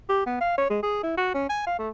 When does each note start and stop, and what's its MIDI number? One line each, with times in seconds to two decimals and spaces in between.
0.09 0.23 67
0.26 0.40 59
0.41 0.55 77
0.58 0.66 73
0.70 0.79 56
0.83 1.01 68
1.03 1.16 64
1.17 1.32 66
1.34 1.47 61
1.49 1.65 80
1.67 1.77 77
1.79 1.90 57